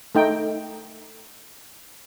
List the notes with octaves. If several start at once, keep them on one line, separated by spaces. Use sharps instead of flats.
A3 D#4 G5